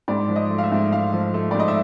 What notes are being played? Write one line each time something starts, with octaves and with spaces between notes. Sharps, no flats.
G#2 D5
F3
D#5
A3
F5
E5
G#2
G#2 F5
F3
A3
D5
G#2
D#5
E5